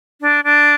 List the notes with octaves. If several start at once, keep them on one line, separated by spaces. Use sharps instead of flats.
D4
D4